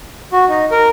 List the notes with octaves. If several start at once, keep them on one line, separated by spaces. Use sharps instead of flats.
F#4
D#4
A#4